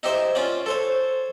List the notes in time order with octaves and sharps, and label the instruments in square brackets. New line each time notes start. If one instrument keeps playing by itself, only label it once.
[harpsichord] D#4 E4 G4 C5 E5
C#4 F4 D5
A4 C5 C#5